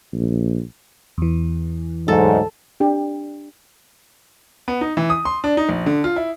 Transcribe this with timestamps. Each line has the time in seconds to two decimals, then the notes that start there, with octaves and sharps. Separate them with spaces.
0.13 A#1
1.18 E2 E3
2.08 D2 G#2 F#3 A4
2.80 D4 G4
4.68 B3
4.81 D#4
4.97 E3
5.10 D#6
5.25 C6
5.44 D4
5.57 D#4
5.69 A#1
5.86 D3
6.04 F4
6.16 E4